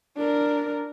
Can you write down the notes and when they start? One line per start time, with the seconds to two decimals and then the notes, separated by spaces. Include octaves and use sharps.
0.17 D4 A#4